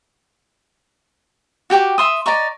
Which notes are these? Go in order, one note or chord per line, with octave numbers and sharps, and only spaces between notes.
F#4 G4 G5 D6
E5 C6 D#6
D5 D#5 A#5 C#6